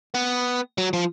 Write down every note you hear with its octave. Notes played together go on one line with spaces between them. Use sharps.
B3
F#3
F3